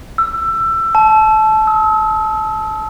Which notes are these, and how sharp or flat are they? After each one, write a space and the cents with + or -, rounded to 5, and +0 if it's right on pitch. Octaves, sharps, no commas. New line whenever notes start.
E6 +20
A5 -20
E6 -45